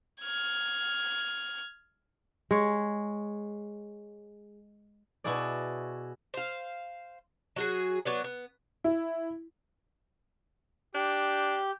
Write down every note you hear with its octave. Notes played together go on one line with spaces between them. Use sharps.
F6 G#6
G#3 C#5
B2 E4 F#4 G#4 D5
C5 F5
F#3 F#4 G#4
F#3 B3 D5
B3
E4
D4 G4 G6